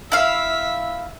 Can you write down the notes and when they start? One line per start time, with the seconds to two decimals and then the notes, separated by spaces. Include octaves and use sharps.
0.12 E4 E5 F5